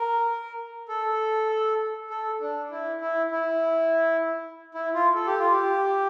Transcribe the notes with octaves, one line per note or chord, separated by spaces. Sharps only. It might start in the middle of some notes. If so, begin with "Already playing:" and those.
Already playing: A#4
A4
A4
D4
E4
E4
E4
E4
F4
A4
G4
F4
G4